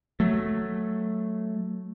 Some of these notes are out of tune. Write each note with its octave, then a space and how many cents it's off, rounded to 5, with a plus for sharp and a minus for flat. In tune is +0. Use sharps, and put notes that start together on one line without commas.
F#3 +0 A3 +0